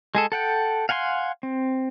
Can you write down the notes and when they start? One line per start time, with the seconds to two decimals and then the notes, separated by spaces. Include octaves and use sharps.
0.15 G#3 G#4 A4
0.32 A4 F#5 G5
0.89 F5 F#5 G#5 B5 C6
1.43 C4